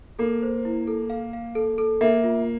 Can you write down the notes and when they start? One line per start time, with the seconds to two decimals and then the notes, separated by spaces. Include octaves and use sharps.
0.19 A#3 A4
0.43 C5
0.65 E4
0.87 A4
1.10 F5
1.33 F5
1.55 A4
1.78 A4
2.01 A#3 E5
2.24 F4